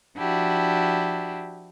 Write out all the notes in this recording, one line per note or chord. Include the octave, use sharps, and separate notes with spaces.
F3 D4 E4 F#4 G4